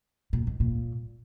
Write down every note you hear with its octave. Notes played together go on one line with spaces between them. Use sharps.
A#2
G#2
A#2